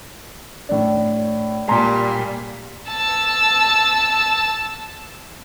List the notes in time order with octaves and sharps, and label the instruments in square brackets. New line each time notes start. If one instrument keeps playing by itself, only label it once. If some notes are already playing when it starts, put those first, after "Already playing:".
[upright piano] A2 D4
[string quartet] A#2 G3 [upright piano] G#5 A#5 C6
[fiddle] A5 E6